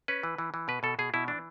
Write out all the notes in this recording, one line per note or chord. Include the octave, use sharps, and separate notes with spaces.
C#4 B4
E3
E3
E3
B2 B4
B2 A4
B2 G#4
B2 E4
E3 D4